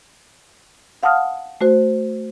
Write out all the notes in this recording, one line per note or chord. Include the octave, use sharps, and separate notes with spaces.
F5 F#5 A5 D#6 F6
A3 F#4 C5